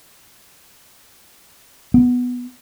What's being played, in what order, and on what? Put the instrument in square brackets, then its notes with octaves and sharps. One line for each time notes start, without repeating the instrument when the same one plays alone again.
[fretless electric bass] B3